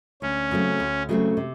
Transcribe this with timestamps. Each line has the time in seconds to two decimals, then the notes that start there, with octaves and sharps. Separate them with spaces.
0.22 D2 C#4
0.51 C#3 F#3 A3 C4
0.80 D2
1.09 C#3 F#3 A3 C4
1.37 C3